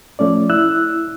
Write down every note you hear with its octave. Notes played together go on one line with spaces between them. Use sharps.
F3 A3 C#4 D5
E4 E6 F#6